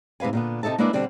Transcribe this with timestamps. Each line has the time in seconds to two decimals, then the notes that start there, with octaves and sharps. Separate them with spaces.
0.20 G#2 C3 B4 F5 G#5
0.33 A#2 D3 B3
0.63 C3 D#4 A4 E5 A5
0.78 G#3 A#3 D4 E4 B4 D5
0.93 B2 D3 G3 C4 D4